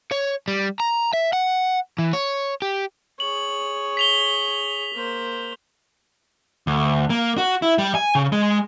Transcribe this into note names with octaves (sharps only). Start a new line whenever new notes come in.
C#5
G3
A#5
E5
F#5
E3
C#5
G4
G#4 C#5 F#7
B6 F7 G7
A#3 C5
D2
A#3
F#4
E4
G3
G#5
C#3
G#3